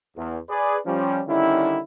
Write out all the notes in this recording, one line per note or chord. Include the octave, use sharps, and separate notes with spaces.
E2
G#4 B4 D5
F3 G3 C#4
D3 D#3 G3 C#4 E4